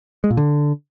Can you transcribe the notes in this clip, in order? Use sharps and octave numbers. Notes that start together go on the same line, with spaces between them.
G#3
A#2
D3